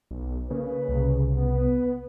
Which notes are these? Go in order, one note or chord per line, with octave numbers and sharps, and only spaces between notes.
B1
C#3 A#3 B4
C2 C3
B3 B4